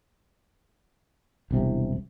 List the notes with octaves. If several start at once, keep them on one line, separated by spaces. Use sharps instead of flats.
E1 C2 C3